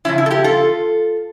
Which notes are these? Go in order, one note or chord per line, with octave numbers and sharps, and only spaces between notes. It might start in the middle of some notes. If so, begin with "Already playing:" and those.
C#3 F3 C#4 E4
E4
A4
E4 G4
F4 A4